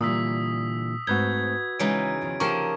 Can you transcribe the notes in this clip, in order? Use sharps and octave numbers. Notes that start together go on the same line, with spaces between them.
A#2 D3 E3 G3 D#6 E6 B6
G#2 A3 C4 F#4 B4 G6 G#6
C#3 E3 G#3 D#4 C#5 F#5 D7
E2 D#3 F3
D3 F3 A#3 F4 G4 C#6 E7